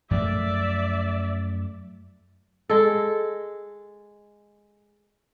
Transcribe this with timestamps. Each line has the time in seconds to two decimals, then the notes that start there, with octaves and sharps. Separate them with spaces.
0.11 F#2 F3 A3 D5 E5
2.69 G#3 A4